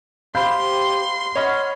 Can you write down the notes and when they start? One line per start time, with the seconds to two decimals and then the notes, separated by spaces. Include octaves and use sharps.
0.35 G4 C5 F5 B5 C6 G6
1.36 C#5 D#5 F#5 B5 C#6 F6